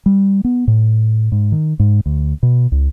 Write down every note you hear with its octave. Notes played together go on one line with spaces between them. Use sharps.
G3
B3
A2
G#2
D#3
G#2
D2
B2
C#2